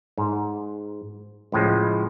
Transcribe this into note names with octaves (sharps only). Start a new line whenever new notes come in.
G#2
C#2 A2 F3 G#3